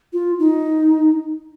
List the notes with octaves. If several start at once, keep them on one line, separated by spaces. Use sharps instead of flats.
F4
D#4